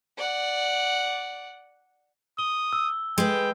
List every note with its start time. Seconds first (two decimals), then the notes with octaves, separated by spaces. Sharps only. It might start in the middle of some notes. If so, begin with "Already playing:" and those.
0.18 D5 F#5
2.39 D#6 G7
2.73 E6
3.18 G#3 B4 G5